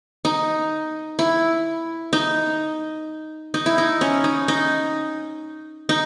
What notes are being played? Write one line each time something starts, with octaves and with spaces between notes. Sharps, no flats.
D#4
E4
D#4
D#4
E4
D#4
C#4
D#4
D#4
D#4